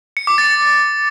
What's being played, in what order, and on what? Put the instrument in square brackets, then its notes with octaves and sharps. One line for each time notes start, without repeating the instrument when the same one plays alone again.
[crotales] C#7
D6
A6